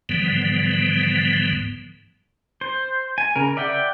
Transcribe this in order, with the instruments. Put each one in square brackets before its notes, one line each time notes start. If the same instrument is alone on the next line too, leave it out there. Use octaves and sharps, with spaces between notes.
[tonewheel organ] G#2 D3 E3 F3 G3 B3
[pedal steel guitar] C5
G#5
C#3 A#4
D5 E5 F#5 G5